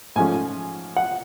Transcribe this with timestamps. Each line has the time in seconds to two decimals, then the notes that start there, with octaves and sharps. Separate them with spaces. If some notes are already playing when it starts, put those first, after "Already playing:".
0.16 G#2 F3 A3 C#4 G#5
0.96 F#5